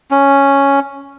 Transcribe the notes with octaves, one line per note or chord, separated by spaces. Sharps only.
C#4